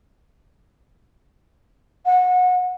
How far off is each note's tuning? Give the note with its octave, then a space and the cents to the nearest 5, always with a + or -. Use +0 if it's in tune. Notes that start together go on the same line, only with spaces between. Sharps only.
F#5 -25